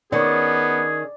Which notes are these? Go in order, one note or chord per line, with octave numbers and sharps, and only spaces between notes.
D#3 B3 C#4 G#4 D5